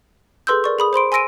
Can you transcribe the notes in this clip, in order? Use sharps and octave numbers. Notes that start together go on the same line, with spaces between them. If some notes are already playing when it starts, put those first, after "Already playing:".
G#4 A4 B4 C6 E6 G6
A#4 D5 C#6
G#4 B5 D#6
C5 B5 C6 D7
G#5 C6 E6 A#6 D7 D#7